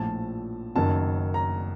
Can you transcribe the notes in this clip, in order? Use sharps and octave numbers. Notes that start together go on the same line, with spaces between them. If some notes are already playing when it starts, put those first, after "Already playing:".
Already playing: A#1 A2 F3 A5
F#1 F#2 D#3 A5
A#5